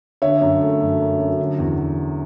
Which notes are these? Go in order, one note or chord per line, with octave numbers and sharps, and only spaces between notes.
D3 C#5 E5
F#2
A3
F#2
F#2
F#2
D3
E2